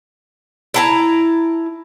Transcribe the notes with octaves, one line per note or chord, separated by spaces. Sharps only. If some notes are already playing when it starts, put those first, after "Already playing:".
E4 A5 A#5